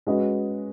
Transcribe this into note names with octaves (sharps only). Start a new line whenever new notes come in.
G#3 C#4 F#4 B4 D#5